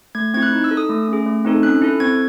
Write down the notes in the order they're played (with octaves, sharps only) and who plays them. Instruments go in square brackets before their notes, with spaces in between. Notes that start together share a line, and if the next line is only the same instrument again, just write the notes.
[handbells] A3 G#6
C4 E4 G#6
F#6
D#4
E6
A4
D#6
A3
C#4 G#4
A3
C4 D#4 A4
C#4 F#6
E4 A4
C4 G#6